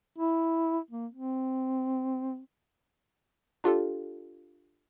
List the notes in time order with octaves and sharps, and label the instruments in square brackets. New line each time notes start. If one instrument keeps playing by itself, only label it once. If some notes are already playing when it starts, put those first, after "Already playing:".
[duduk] E4
A#3
C4
[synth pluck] D4 F4 G4 A4